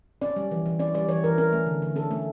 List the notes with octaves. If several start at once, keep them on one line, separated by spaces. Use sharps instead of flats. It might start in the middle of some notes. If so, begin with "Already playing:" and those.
C#4 D5
G3
E3
E3
C#4 D5
G3 D5
E3 C#5
E3 A#4
C#4 A#4
A3
D3
D3
C#4 A4
A3